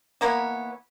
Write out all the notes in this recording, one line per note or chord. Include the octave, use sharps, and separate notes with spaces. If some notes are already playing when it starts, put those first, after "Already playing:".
E3 A#3 B3 C#5